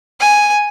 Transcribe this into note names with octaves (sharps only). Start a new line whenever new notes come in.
G#5